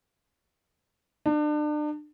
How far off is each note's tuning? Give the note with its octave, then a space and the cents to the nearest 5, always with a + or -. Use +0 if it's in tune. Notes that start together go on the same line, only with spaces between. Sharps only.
D4 +35